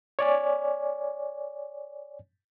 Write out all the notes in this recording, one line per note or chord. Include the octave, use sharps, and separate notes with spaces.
C#5 D5 G#5